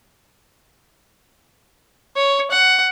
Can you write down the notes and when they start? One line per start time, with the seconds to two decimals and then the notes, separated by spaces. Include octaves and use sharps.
2.16 C#5
2.51 F#5